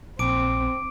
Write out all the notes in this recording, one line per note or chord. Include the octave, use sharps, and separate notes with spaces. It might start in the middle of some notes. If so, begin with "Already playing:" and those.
A#1 C4 D6 D7